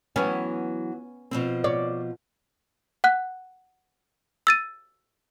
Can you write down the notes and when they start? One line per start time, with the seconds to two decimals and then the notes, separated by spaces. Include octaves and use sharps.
0.16 E3 F#3 B3 C#4
1.31 B2 F3 C4
1.64 C#5 D5
3.04 F#5 F#6
4.47 E6 A6 D#7